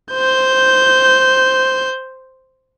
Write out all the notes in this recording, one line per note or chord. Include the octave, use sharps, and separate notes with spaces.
C5 G6